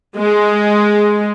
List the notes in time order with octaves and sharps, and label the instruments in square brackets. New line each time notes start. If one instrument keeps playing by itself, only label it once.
[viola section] G#3